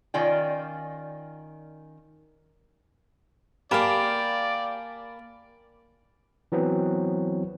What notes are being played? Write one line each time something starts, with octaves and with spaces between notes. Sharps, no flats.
D#3 C#4 F4 D5 G5
A#3 G4 D5 F5 G#5 A5 B5
E3 F#3 B3 C4